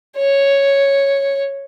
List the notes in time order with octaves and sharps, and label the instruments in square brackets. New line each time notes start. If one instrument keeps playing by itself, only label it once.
[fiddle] C#5